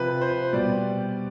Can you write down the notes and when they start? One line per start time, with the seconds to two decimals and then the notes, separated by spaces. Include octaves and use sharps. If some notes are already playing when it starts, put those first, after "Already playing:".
Already playing: C3 F3 B4
0.22 C5
0.53 B2 G3 D5